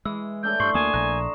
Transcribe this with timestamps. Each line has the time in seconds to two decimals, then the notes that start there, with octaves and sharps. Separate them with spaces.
0.05 E3 G#3 E6
0.43 A3 D4 A4 G6
0.60 G2 C6 C#6 C7
0.74 D2 A#3 G#5 D#6 E7
0.94 A#1 A#5 F#6